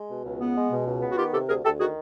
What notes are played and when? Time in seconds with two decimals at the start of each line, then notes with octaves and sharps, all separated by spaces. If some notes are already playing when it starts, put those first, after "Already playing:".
Already playing: G#3
0.09 B2
0.24 C#2
0.40 B3
0.56 G#3
0.71 B2
0.86 C#2
1.02 B3
1.10 F#4
1.17 D#3 F4 G4
1.33 C3 G4 A4
1.48 D2 G#4 A#4
1.64 D2 G4 A4
1.80 D#3 F#4 G#4